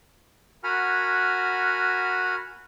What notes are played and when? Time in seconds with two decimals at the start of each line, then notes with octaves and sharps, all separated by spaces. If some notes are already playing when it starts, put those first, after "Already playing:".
0.64 F#4 A#4 F#5 G#5 B5 F6